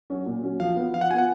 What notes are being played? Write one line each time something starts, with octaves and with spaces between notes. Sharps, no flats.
F#3 C#4 F#4
A#2
F#3 C#4 F#4
F3 F5
B3 F4
F3 F5
F#5
B3 F4 F#5 G#5